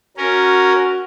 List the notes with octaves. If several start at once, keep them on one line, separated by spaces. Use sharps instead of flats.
C#4 F#4 A#4